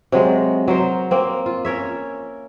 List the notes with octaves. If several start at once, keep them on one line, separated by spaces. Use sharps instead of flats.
C3 F#3 G#3
F#3 A#4 C5
A#3 C4
F4
C#4 A#4 C#5 E5